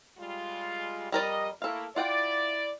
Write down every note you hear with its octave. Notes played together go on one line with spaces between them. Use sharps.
G3 G#3 F4
F2 G3 A#4 D5 D#5
A3 A#3 E4 A4 F5
E4 F4 D5 F#5 G5